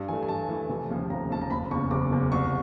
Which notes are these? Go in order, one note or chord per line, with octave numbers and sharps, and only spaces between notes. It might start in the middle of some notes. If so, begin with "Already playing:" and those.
Already playing: G2
E3 A3 G#5
G#5
G2 A5
E3 A3
F1
D#2 C#3 F3
F1 A#5
D#2 C#3 F3 A5
A#5
F#1 B5
E2 C#3 C#6
F#1 D6
E2 C#3
C2 C#6